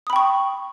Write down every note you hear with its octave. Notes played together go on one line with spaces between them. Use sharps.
G5 B5 C#6 D#6